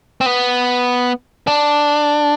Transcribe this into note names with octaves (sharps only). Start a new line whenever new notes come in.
C4
B3
D4